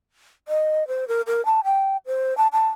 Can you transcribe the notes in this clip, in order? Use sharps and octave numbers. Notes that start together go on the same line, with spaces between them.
D#5
C5
A#4
A#4
A5
G5
C5
A5
A5